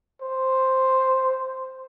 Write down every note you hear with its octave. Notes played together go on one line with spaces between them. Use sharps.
C5